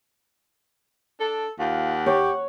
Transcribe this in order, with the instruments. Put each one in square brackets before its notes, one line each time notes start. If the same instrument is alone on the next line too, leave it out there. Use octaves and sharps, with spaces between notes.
[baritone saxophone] D4 [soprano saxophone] A4
[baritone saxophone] D#2 [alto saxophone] F4 [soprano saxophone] F#5
[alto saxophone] G4 [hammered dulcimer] C#5